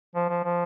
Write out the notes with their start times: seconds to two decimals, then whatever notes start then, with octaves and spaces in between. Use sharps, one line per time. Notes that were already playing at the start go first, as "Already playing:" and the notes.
0.15 F3
0.29 F3
0.44 F3